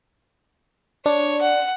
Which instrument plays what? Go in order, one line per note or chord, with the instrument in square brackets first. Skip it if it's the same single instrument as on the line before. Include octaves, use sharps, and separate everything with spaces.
[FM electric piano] D4 [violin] C#5
[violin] F#5